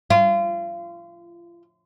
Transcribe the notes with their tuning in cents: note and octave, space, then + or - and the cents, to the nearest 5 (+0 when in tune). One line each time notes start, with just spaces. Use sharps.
F4 -30